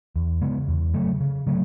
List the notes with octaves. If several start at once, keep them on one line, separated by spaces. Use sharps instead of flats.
E2
C#3 G#3 B3
E2
C#3 F#3 A3
C#3
C#3 F#3 A3